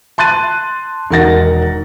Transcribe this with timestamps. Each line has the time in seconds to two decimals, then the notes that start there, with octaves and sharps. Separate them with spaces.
0.18 A5 C6 F#6 A6 D#7
1.11 E1 D#3 A#4 F#5 A6 A#6